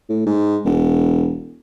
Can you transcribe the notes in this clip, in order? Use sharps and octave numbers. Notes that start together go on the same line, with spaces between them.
A2
G#2
E1